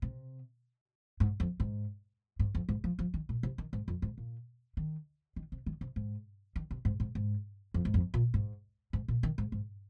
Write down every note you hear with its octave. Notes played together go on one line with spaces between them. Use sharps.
C3
G#2
F2
G#2
G#2
F2
G#2
F3
F3
D#3
A#2
C3
D#3
G#2
F2
G#2
A#2
D#3
D#3
C3
D#3
C3
G#2
D#3
C3
G#2
G#2
G#2
F2
G#2
F2
A#2
G#2
G#2
A#2
D#3
G#2
G#2